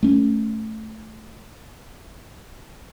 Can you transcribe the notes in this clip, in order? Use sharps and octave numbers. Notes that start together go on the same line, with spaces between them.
A3 C#4